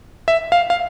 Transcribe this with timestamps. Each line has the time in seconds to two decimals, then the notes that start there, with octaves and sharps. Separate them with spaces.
0.28 E5
0.52 F5
0.70 F5